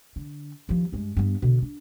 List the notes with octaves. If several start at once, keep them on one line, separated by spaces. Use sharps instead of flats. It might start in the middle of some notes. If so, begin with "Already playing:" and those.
D3
D#2 F3
G2 G#3
G2 B3
B2 D3
D4